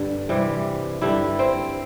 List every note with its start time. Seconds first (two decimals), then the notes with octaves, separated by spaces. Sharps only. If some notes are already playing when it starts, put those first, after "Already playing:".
Already playing: G2 D3 G3
0.29 C3 E3 G3
1.02 G2 D3 G3 E4
1.39 C4